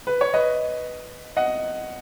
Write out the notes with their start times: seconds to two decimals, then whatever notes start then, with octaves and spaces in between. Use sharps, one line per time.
0.07 B4
0.21 C#5
0.34 B4 D#5
1.37 D#5 F#5